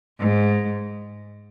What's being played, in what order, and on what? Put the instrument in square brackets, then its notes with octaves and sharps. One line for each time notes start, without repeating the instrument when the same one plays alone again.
[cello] G#2